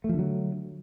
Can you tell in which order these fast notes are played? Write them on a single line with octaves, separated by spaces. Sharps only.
A3 F3 D3 F#3